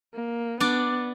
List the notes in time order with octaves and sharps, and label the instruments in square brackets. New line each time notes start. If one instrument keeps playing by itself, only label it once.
[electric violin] A#3
[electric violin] B3 [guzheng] D4 D5